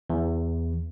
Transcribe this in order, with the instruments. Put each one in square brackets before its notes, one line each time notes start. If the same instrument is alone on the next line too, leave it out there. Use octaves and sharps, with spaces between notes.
[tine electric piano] E2